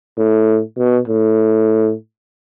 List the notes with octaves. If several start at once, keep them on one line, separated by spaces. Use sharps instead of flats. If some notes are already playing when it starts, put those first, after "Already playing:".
A2
B2
A2